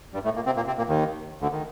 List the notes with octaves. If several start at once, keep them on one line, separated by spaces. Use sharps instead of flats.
G2 G3
A2 A3
A#2 A#3
C3 C4
A#2 A#3
C3 C4
A#2 A#3
D#2 D#3
D2 D3
D#3